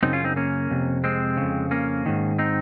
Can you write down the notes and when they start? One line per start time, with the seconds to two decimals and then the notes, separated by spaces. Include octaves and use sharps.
0.02 F#2 C#3 C4 D#4
0.13 C#4 F4
0.24 C4 D#4
0.36 A#3 C#4
0.71 F2 C3
1.04 G#3 C4
1.37 F2 C#3
1.71 A#3 C#4
2.06 G#2 D#3
2.38 C4 D#4